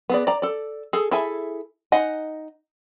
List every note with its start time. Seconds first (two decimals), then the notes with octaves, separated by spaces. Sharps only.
0.10 B3 G#4 D5
0.27 D5 A#5
0.42 A4 D5
0.93 G#4 A4
1.11 E4 G#4 A4 E5 G#5
1.92 D#4 D#5 F#5 G#5